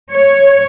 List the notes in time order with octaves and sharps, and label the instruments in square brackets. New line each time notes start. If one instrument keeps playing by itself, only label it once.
[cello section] C#5